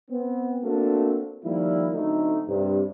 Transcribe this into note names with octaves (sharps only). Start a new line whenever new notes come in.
B3 C4
A3 A#3 C4 D4 F#4 A4
D#3 F3 G3 A#3 E4
D3 F#3 A3 C4 D#4
G2 C3